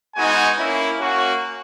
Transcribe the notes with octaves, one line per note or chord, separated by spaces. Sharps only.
G#3 B3 D#4 F#4 G#5
A#3 C#4 E4
A#3 C#4 F#4